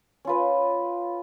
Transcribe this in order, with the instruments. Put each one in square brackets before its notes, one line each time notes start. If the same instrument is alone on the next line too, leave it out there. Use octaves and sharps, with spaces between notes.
[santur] C#4 F4 B4